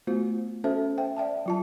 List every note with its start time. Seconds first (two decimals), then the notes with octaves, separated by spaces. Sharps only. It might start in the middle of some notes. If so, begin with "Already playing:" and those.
0.07 A3 B3 F4 F#4 C5
0.64 C#4 F#4 A4 C5 E5
0.98 C5 E5 G5
1.16 D5 E5 G5 A5
1.46 F#3 F4 A5